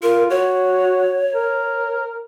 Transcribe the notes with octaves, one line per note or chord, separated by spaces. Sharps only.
F4 A#4
F#4 C#5
A#4